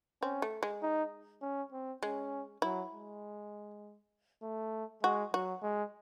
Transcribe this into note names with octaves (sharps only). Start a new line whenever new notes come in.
C4 C#4
A3
G#3
D#4
C#4
C4
G#3 C#4
F#3 E4
G#3
A3
G#3 F#4
F#3 F#4
G#3